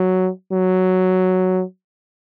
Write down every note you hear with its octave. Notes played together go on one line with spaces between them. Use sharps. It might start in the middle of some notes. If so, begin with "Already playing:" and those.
Already playing: F#3
F#3